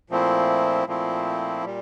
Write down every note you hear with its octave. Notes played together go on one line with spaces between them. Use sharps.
A#2 F3 A3 C4 E4
A#2 F3 A3 C4 E4
A#2 G3